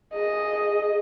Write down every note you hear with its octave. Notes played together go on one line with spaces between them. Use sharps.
G#4 D#5